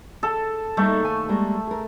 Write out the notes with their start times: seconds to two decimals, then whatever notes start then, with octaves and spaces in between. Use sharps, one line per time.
0.23 A4
0.77 G3 A3 A#3 D#4
1.04 D#2 A4 G#5
1.29 G3 G#3 A#3
1.67 G#4 A#4